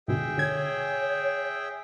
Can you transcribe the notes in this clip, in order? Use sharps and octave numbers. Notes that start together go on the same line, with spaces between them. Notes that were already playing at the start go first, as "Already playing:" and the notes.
G#2 B2 D3 G#4 E5 G5
D3 C#5 G#6